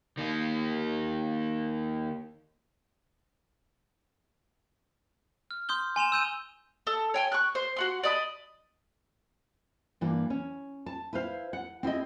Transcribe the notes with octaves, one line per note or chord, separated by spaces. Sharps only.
D#3 A#3
F6
C6 D#6 G6 G7
G#5 C6 E7 F7
E6 G6 D#7
A4
C#5 G5 G#5
C#6 F#6
C5
F#4 F#5 C6
D5 D#5 B5
G2 E3 A#3
C#4
A5
E4 B4 C5 F5
F#5
C4 E4 G#4 D#5